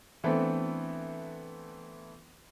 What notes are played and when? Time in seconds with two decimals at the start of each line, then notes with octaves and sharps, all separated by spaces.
0.24 E3 A3 B3 C4 D4